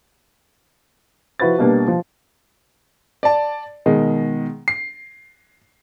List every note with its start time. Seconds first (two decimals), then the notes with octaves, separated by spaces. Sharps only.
1.40 F3 E4 F#4 B4 C5 A6
1.58 B2 G3 A#3 B3 D4
1.88 F3
3.23 D5 A5
3.86 B2 D#3 G#3
4.68 C7